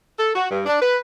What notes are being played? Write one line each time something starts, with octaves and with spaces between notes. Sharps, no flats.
A4
F#4
G2
D4
B4